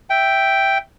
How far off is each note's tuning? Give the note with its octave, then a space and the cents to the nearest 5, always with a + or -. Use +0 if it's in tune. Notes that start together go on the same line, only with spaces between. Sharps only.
E5 +0 G5 +0